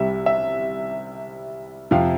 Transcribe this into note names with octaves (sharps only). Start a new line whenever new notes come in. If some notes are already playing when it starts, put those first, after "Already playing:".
Already playing: C2 C3 G3 E5
E5
F2 C3 F3 F5